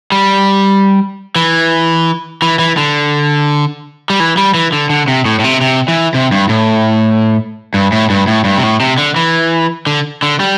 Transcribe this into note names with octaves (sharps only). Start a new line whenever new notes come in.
G3
E3
E3
E3
D3
G3
E3
G3
E3
D3
D3
C3
A2
A2
C3
C3
E3
C3
G2
A2
G2
A2
G2
A2
G2
C3
A2
C3
D3
E3
D3
D3
G3